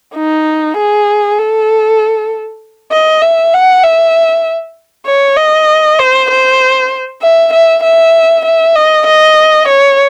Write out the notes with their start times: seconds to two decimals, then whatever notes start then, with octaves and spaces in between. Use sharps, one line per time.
0.15 D#4
0.77 G#4
1.39 A4
2.92 D#5
3.22 E5
3.54 F#5
3.84 E5
5.07 C#5
5.37 D#5
5.99 C5
6.31 C5
7.22 E5
7.54 E5
7.83 E5
8.46 E5
8.76 D#5
9.07 D#5
9.68 C#5